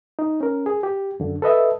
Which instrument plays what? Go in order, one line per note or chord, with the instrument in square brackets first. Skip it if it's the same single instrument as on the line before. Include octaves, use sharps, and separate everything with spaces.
[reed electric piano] D#4
C#4 A#4
G#4
G4
F#2 D3
A4 B4 D#5 E5